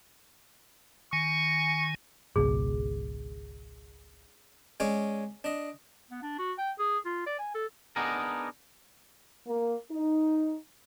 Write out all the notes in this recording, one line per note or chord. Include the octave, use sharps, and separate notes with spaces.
D#3 G#5 C#6
G#1 C#2 B2 G#4
G#3 C#4 D5 G#5
D4 D#5
B3
D4
F#4
G5
G#4
F4
D5
G#5
A4
B3 D4 D#4 G#4 A#4
A#3
D#4